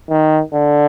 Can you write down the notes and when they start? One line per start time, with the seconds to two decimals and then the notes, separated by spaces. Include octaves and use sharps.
0.10 D#3
0.54 D3